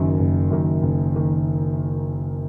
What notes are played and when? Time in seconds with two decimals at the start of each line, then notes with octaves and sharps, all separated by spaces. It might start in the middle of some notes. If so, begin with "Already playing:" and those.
Already playing: F#1 F#2 D#3
0.19 F#1
0.51 F#2 D#3
0.83 F#1
1.16 D#3